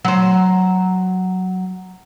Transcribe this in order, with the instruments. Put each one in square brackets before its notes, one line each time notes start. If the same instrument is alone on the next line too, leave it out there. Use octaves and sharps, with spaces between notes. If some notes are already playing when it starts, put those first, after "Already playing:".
[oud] F#3 C5